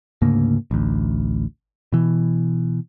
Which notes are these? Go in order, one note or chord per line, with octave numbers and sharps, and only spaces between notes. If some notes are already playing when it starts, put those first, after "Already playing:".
D2 G#2 C#3 A#3
A1 D2
B2 E3